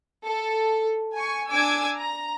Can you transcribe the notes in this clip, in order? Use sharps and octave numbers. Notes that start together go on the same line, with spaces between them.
A4
G#5 C#6
D4 G#5 D6 E6 G#6
A#5